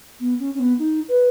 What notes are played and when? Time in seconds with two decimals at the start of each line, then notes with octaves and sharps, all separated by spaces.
0.20 B3
0.40 C#4
0.54 C#4
0.60 B3
0.79 D#4
1.09 B4